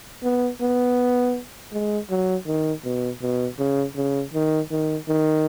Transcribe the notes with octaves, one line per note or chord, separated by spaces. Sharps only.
B3
B3
G#3
F#3
D#3
B2
B2
C#3
C#3
D#3
D#3
D#3